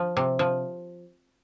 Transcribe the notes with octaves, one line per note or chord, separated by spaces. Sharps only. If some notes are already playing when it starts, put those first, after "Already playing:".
Already playing: F3
C3
F3